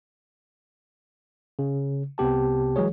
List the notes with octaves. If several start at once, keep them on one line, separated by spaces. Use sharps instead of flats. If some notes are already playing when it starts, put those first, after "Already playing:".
C#3
C2 C3 B3 G4 A5
E3 F#3 G#3 G#4 C#5